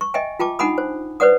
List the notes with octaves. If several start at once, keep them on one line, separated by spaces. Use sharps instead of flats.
C#6
D#5 E5 G5 G#5
F4 G5 A5 D6
D4 D#4 F#5 G#5 B5 D#6
C5
B4 C5 D5 F#5 D#6